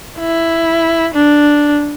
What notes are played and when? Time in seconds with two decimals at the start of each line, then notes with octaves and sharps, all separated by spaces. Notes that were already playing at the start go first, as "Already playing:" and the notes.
0.19 E4
1.14 D4